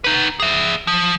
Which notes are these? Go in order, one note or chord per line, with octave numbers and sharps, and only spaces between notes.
D#4 B4
G#4 E5
F3